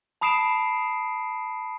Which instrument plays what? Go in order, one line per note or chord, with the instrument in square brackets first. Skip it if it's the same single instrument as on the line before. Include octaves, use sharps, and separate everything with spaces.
[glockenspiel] A5 B5 D#6 C7 D7 E7